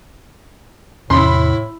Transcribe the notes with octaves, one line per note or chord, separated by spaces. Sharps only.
E2 A2 C3 E4 B5 C6